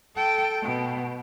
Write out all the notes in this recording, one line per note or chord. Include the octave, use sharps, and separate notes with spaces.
A4 G5
B2